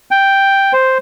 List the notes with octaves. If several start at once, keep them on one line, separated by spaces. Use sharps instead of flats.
G5
C5